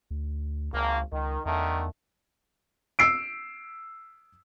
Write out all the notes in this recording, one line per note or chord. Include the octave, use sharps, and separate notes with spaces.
D2
G#1 C#2 A#3
C#2 D#3
E2 D3 D#3 A3
E6 C7 D7